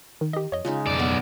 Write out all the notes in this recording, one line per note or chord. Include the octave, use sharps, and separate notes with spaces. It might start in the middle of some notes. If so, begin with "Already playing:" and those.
D#3
D#3 G4 D#5
F2 C#5 D#5
C#3 G#3 D#4 F4
B1 F2 D5
B3 F5